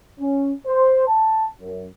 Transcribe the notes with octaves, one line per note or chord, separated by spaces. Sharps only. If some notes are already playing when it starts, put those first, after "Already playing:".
C#4
C5
A5
F#2